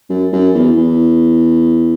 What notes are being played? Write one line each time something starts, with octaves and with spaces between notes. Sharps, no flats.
F#2
F#2
E2
E2